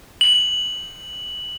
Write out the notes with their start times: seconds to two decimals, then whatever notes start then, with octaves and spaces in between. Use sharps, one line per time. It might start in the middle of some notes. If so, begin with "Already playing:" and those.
0.21 F#7